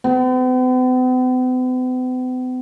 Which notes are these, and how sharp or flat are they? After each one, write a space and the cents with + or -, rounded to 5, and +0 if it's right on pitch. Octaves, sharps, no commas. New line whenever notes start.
B3 +45